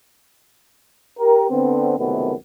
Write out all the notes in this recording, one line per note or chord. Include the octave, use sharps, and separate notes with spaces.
G4 A#4
D3 B3 C4
C#2 F#2 C3 D#3 A3 B3